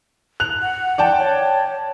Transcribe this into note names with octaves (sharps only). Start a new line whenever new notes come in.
F#6 F7
F#5
D5 G5 A5
C#5